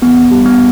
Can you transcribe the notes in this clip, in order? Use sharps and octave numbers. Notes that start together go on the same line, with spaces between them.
E2 B3
G3
B3